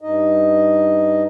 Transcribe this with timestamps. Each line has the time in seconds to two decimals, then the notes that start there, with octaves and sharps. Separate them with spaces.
0.01 G2 D#4 D#5